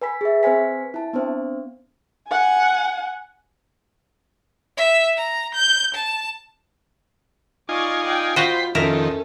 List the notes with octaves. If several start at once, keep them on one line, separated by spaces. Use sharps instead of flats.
B4 G#5 B5 B6
G#4 E5
C4 B4 C5 G#5 B6
E4 A5
B3 C4 D4 C5
F#5 G#5
E5
A#5
G6
A5
D#4 F4 D5 G#5 C#6
D5 G5
F4 F#4 C5 D#5 F5 G5 B5
F2 D#3 C#4 E4 A4 A#4